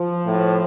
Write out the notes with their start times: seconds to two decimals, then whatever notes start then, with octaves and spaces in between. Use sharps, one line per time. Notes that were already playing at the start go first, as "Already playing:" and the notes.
Already playing: F3
0.26 A2